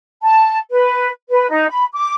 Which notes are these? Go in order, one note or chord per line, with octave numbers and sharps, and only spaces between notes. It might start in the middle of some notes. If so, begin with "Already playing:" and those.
A5
B4
B4
D#4
B5
D6